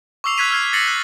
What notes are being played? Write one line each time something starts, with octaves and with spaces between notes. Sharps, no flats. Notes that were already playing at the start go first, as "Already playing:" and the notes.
C#6 D6 E6 C7 F7
E6 F#6 G#6 B6 D#7 F7
E6 F6 G#6 C7
A6 A#6 C7 C#7 F#7
F#6